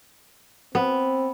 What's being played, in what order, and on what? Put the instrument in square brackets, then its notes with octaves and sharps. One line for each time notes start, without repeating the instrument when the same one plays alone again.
[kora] B3 [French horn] C4